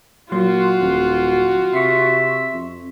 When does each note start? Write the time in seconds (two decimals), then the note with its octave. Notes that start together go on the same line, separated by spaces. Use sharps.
0.32 A#2 F#3 F4 F#4 C6
0.80 D#1
1.73 C3 E5 C6 C#6
2.53 F2